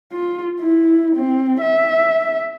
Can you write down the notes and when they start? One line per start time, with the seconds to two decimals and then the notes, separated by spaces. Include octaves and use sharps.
0.13 F4
0.60 E4
1.16 C4
1.61 E5